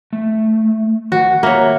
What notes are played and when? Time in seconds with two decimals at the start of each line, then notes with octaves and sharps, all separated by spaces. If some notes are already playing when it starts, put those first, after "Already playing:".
0.13 A3
1.12 D#3 F#4
1.43 A#3 C#5 E5